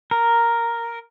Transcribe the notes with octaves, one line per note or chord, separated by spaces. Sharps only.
A#4